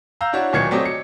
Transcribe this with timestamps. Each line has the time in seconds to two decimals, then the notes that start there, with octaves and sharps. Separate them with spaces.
0.21 F5 A#5 E6 G6
0.33 D4 E4 F#4 C#5
0.53 D1 A#2 D#3 C#6 G#6 C#7
0.71 F#3 A3 C4 G4 D5 D#5
0.85 C#7